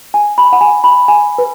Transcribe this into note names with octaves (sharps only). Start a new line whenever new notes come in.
G#5
B5
F#5
G#5
B5
G#5
B4